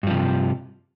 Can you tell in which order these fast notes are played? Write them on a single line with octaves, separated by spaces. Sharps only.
G2 F3 C3